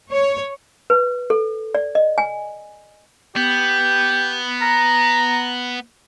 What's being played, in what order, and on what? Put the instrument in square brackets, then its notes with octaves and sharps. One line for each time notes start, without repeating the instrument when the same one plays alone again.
[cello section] C#5
[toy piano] B4
A4
D5
D#5
G#5
[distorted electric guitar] B3 [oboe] G4
[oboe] A#5